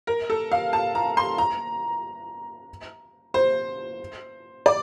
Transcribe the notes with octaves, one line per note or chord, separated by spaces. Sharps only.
A#4
A4
F5
A5
A#5
C6
A#5
C5
D5